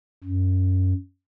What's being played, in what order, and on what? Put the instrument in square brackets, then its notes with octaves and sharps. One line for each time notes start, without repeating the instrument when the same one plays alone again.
[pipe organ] F#2